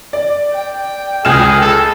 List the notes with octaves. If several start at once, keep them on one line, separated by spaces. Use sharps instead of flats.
D5
G5
C#2 G#4 F6 E7
A4